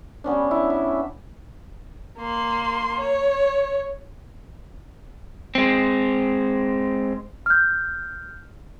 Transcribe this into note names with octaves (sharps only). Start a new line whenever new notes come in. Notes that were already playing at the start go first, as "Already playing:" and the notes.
G3 B3 C#4 D4
E4
E5
A#3 C6
C#5
G#3 C4
F6 G6